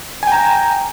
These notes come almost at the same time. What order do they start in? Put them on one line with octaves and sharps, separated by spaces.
G#5 G5 A#5